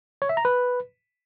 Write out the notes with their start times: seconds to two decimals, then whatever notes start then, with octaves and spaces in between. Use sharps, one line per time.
0.22 C#5
0.29 E5
0.37 A#5
0.45 B4